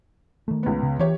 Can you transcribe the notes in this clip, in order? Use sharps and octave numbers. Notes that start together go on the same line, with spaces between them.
D#3 A3
C#2 B3
C#3
E3 G4 C#5